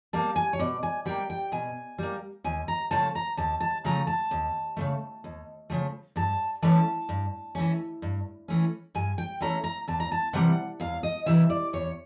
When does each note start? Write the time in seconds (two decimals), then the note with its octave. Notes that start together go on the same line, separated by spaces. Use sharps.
0.13 G3 A#3 A5
0.36 G#5
0.53 C#5
0.59 B2 D5
0.83 G#5
1.05 G3 A#3 G5
1.30 G5
1.52 B2 G#5
1.98 G3 A#3
2.44 D#2 G#5
2.68 A#5
2.91 C#3 F3 A3 A5
3.15 A#5
3.37 D#2 A5
3.60 A5
3.85 C#3 F3 A3 A#5
4.07 A5
4.31 D#2
4.77 C#3 F3 A3
5.24 D#2
5.70 C#3 F3 A3
6.16 G2 A5
6.62 E3 A3 C#4 A5
7.09 G2
7.55 E3 A3 C#4
8.02 G2
8.48 E3 A3 C#4
8.95 G2 G#5
9.18 G5
9.40 E3 A3 C#4 A#5
9.64 A#5
9.88 E2 A5
10.00 A#5
10.12 A5
10.33 C3 E3 G3 F#5
10.80 E2 F5
11.03 D#5
11.26 C3 E3 G3 E5
11.50 D5
11.73 E2 C#5